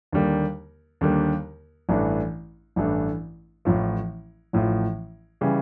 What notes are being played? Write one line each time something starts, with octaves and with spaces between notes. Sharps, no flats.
D#2 D3 G3 A#3
D#2 D3 G3 A#3
A1 G2 E3 A3 D4
A1 G2 E3 A3 D4
A1 A2 F3
A1 A2 F3
C#3 E3 G3